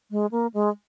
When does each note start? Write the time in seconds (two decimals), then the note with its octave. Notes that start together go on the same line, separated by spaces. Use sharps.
0.11 G#3
0.31 A#3
0.54 G#3